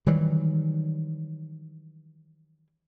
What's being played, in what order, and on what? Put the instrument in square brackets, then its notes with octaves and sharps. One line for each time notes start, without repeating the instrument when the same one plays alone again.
[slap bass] D#3 E3 F#3 G3